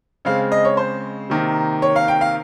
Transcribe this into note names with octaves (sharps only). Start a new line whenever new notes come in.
C#3 G#3 C4 F5
D#5
C#5
C5
C3 D#3 A#3
C#5
F5
G5
F5